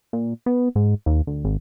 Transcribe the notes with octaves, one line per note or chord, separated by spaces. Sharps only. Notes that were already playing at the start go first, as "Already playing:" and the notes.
A#2
B3
G#2
D#2
D2
G#1